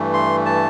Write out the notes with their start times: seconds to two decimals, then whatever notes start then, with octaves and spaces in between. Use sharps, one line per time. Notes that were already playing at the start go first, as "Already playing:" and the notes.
Already playing: G2 E3 A3
0.14 C6
0.46 A5